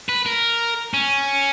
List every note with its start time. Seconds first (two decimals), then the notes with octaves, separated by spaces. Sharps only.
0.09 B4
0.26 A#4
0.94 C#4